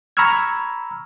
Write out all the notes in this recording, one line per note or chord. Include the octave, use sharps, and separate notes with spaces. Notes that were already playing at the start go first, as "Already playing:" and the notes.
A#5 B5 C#6 E6 F6 G#6